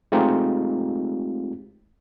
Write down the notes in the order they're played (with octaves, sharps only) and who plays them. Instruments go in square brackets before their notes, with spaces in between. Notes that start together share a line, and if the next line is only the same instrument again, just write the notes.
[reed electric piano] G#3 A3 C4 D#4 F4 G4